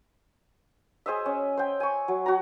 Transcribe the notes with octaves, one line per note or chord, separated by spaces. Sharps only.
G#4 C5 D#5 E5
C#4
C5 G5
G#5 C#6
F#3
F#4 A#5